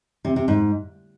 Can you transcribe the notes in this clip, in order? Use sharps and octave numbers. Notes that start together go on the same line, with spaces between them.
C3
C3
G#2